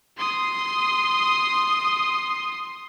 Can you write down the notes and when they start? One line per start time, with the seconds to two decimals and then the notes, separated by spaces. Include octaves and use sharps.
0.18 C6 D#6